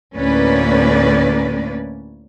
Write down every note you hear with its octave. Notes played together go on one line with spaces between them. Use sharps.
D2 A2 A#3 C#4 B4 D5